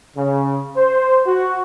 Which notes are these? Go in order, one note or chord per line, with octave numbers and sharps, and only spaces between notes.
C#3
C5
F#4